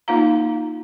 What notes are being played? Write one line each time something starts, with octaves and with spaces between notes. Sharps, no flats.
A#3 D#4 F4 F5 A#5